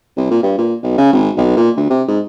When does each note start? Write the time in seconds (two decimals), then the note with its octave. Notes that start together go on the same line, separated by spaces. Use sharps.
0.17 C2
0.31 A#2
0.43 G2
0.58 A#2
0.83 B1
0.98 C#3
1.13 G#1
1.37 B1
1.57 A#2
1.77 D2
1.90 C3
2.08 G#2